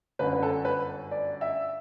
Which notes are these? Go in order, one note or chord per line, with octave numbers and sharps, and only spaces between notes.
G1 F#2 D3 B4
B4
A4
B4
D5
E5